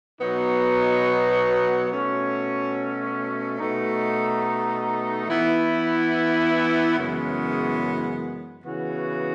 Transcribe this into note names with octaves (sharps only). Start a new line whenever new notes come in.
B2 F#3 B3 D#4
B2 A3 C#4 F#4
B2 A3 D#4
E3 B3 E4
F#2 C#3 E3 G#3 B3
C#3 E3 B3 F#4